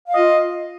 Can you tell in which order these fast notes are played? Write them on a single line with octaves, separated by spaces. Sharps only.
F5 D#5 F4